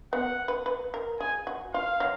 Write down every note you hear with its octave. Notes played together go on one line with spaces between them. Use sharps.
B3 F#5
B4
B4
A#4
G#4 G#5
F#4
F4 F5
F#3